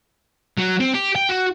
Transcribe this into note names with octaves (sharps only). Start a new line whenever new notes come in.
F#3
C4
G4
G5
F#4